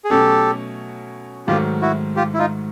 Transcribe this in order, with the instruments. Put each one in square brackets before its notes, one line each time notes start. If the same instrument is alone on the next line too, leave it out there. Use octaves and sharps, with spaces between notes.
[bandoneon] G#4
[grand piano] B2 F#3 A3 C#4 [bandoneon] G4 A4
[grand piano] G#2 D#3 F#3 A3 [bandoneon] F4 G4
[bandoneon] E4 F#4
F4 G4
E4
D#4 F4